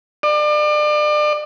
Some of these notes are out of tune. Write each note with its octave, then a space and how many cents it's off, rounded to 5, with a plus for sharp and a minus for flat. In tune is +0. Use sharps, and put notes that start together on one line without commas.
D5 +35